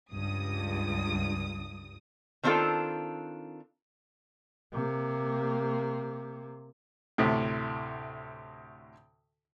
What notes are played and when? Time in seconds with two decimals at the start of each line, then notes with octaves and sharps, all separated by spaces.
0.12 C#2 G2 D#6
2.43 D#3 C4 D4 D#4 F4 A4
4.73 C3 A#3
7.18 D2 A2 C3